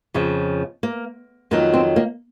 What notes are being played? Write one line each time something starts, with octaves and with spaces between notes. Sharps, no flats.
F2 C#3 F3
A#3
F2 D#3 F#3 A#3
C4
A#3